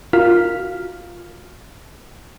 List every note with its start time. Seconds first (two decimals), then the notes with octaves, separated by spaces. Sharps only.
0.13 F4 F#4 A#4 F5 F6 B6